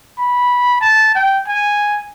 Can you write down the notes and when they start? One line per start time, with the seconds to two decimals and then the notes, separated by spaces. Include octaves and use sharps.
0.18 B5
0.81 A5
1.15 G5
1.48 G#5